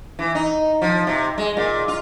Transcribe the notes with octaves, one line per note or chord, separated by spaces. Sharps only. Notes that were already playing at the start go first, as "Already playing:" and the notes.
E3
D#4
F3
C3
G#3
A#2
F4